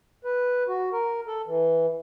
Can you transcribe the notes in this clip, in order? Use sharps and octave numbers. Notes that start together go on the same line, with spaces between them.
B4
F#4
A#4
A4
E3